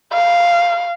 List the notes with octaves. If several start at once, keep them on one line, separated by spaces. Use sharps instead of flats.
F5